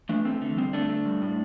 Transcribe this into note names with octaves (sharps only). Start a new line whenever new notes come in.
E3 A3 D4
A3 C4
D3 A3
G3 C4
D3 A3 D4
A3
G3
A2